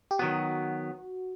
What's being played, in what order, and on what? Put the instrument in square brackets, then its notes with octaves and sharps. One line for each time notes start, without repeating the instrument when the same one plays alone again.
[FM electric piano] G4
[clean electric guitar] D#3 F#3 B3 [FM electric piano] F#4